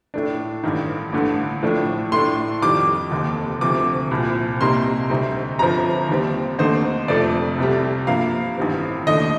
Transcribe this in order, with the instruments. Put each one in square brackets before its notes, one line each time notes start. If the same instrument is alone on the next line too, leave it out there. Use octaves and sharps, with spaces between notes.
[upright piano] A2 A3 D4
A1 G2 D#3
A1 G2 D3 A3
A2 F3 A3 D4
A2 A3 D4 C6
F2 D#3 G3 D6
F1 D#2 D#3
D2 C3 F3 D6
C2 A#2 F3
C2 C3 G3 A#3 D#4 C6
D2 C3 G3 C4 D#4
G1 G2 F3 C4 A#5
D#2 D#3 G3 C4
D#2 D3 A3 C4 D#4 C5
F1 F2 C3 F3 A3 D5
C2 C3 G3
G2 F3 A#3 F5
A1 G2 D#3 G3 C4
D#2 D#3 A3 D4 D#5